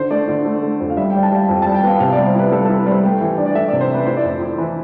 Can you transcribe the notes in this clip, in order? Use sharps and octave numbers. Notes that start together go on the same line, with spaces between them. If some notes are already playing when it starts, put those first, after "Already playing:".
Already playing: D3 C5
A3 D5
D3 D5
A3
A3
F2
F5
G3 E5
G5
G3
A5
G3 F5
F2 G5
A5
G3
G5
B3 F5
C3 F5
D5
G3
C5
E4 B4
G3 A4
A4
E4
B4
G3 C5
A3 G5
E3
D4
D5
A3 E5
D5
C3
C5
A3 B4
E4 C5
D5
F2 C5
E4
E3 B4